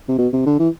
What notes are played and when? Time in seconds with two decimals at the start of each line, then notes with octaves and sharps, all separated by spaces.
0.08 C3
0.18 B2
0.33 C3
0.46 D3
0.59 E3